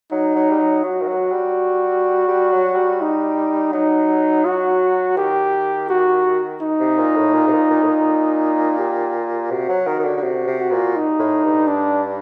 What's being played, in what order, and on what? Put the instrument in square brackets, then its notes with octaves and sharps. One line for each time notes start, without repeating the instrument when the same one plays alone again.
[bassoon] F#3 [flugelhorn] D#4
[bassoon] F#3
G3
F#3
[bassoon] F#3 [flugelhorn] F#4
[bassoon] D#3
F#3
G3
G3
F#3
G3
[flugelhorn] D#4
[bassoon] F#3 [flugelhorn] D#4
[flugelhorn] F#4
[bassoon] D#3 [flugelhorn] G4
[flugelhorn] F#4
D#4
[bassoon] C3
A#2
A2
A#2
C3
A#2
A#2
A2
A#2
[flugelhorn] G4
[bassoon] C3 [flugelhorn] F#4
[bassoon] F#3
D#3
D#3
D3
D3
[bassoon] C3 [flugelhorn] F#4
[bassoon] C3
[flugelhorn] F#4
[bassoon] A#2
[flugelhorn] D#4
[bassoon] A2
G2
[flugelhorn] D4